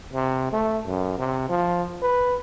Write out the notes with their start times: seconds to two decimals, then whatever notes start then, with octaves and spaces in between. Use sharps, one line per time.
0.14 C3
0.53 A3
0.86 F#2
1.18 C3
1.49 F3
2.02 B4